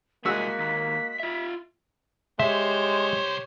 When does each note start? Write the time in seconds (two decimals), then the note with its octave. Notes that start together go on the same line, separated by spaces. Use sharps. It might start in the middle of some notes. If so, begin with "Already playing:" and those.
0.25 C2 G#3 A#3 F#4 G#4 E6 B6
0.59 D#2 B6
1.20 F4 E5
2.39 C2 G#3 G4 C5 C#5 E5